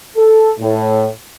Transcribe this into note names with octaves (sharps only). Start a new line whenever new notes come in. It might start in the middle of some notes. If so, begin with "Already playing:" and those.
A4
A2